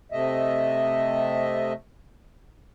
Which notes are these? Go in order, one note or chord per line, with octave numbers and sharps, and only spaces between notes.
C3 A3 D#5 E5